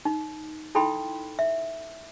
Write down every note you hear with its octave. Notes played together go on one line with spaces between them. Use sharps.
D#4
D#4 E4 A4 G5 B5 C6
E5